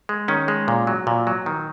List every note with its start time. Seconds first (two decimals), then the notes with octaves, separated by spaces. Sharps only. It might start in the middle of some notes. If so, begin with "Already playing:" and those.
0.09 G#3
0.28 D#3 C#4
0.48 G#3
0.68 A#2
0.87 F#3
1.07 A#2
1.27 F#3
1.46 D#3